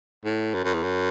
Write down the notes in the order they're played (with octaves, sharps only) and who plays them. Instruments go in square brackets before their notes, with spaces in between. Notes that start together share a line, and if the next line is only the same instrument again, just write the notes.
[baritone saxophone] A2
F#2
F#2
E2
F#2